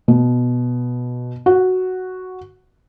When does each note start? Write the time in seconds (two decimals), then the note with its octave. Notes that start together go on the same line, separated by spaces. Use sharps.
0.08 B2
1.46 F#4